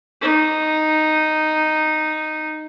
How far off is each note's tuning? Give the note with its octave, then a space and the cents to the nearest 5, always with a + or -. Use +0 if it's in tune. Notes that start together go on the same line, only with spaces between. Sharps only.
D#4 -5